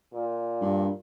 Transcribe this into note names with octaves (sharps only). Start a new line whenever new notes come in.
A#2
G2